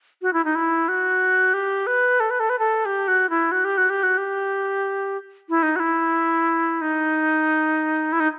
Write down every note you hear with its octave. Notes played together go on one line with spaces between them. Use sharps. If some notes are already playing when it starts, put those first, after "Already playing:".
F#4
E4
D#4
E4
F#4
G4
B4
A4
B4
A4
B4
A4
G4
F#4
E4
F#4
G4
F#4
G4
F#4
G4
E4
D#4
F#4
E4
D#4
E4
D#4